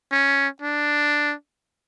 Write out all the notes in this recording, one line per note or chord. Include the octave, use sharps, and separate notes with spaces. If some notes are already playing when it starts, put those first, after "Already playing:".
C#4
D4